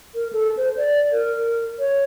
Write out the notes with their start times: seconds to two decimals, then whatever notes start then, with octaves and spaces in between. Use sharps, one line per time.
0.15 A#4
0.33 A4
0.57 C5
0.77 D5
1.12 A#4
1.79 C#5